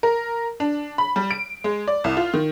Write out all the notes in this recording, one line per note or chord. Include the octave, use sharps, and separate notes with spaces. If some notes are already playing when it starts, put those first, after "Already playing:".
A#4
D4
B5
G3
D7
G#3
D5
C2
F4
D#3